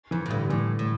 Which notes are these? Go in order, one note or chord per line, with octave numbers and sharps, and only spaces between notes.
F2 E3
A2
G2 D3
A2 E3
A2